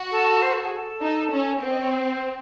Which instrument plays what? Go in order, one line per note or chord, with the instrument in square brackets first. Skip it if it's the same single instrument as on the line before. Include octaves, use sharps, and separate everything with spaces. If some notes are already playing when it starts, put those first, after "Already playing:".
Already playing: [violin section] F#4
[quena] A4
C5
A4
G#4
A4
[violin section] D#4
C#4
[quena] C#5
[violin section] C4 [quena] C5
[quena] D#5
C#5
C5